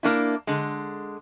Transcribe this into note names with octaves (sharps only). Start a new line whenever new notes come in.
A#3 D4 E4
D3 G#3